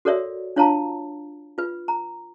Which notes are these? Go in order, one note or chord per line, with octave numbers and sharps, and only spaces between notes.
F#4 A4 A#4 C#5 D5 E5
D4 F4 C#5 F5 A5 A#5
F4 B4
A#5